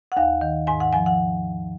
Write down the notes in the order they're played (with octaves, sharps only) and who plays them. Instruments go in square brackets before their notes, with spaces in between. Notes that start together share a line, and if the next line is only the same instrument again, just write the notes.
[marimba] F#5
D#2 F5
D#3
G#2 G#5
F#5
F3 G#5
F#5